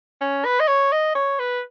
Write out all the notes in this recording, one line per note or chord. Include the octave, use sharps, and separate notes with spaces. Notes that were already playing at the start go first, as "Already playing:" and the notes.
C#4
B4
D#5
C#5
D#5
C#5
B4